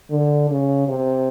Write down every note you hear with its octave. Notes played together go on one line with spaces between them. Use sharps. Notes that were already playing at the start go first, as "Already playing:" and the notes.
D3
C#3
C3